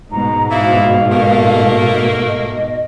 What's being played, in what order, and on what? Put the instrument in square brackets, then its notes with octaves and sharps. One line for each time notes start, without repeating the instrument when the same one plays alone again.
[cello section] G#2 B2 [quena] A#5
[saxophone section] E3 F3 E4 [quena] F5
[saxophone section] A3 A#3
[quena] D#5